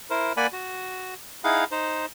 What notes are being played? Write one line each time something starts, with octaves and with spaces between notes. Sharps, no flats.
E4 A#4 C5
A#3 D5 F#5 G#5 B5
F#4
D#4 E4 G#4 F5 F#5
D#4 C5